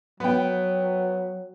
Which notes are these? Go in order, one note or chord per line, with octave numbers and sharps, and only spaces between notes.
F#3 B3 G5